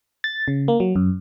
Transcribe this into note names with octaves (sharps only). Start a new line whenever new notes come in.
A6
C#3
A#3
F#3
F#2